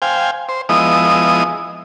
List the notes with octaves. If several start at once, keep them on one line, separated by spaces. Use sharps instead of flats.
C5 F5 G5 G#5
C5
F3 G#3 B3 E4 D#5 D#6